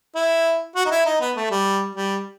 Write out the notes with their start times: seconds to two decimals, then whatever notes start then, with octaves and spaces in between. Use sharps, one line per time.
0.15 E4
0.76 F#4
0.85 D#4
0.91 E4
1.06 D#4
1.21 B3
1.36 A3
1.51 G3
1.95 G3